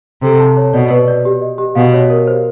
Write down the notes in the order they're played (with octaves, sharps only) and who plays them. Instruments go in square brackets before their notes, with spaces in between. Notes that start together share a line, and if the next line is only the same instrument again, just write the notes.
[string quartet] C3 [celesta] A4
[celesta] A5
C#5
[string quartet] B2 [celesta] D5
[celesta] B4
D5
G4
D#5
G4
[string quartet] B2 [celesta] F5
[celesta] C#5
A#4
C5